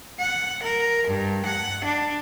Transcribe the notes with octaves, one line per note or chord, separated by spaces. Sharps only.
F#5
A#4
G2
F#5
D4